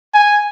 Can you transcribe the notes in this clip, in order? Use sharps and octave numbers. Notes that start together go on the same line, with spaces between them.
G#5